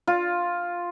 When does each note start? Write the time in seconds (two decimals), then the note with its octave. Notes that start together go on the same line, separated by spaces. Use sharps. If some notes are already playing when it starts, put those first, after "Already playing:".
0.07 F4